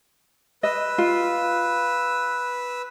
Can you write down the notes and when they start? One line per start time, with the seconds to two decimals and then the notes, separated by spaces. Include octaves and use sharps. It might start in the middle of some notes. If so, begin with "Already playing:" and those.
0.63 B4 D#5 E6
0.98 F4